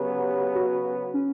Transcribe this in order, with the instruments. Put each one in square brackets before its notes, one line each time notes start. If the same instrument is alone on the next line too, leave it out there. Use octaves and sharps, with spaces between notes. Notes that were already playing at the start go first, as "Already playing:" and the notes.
Already playing: [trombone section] C#3 F#3 B3 [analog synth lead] G4
[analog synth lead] F#4
C#4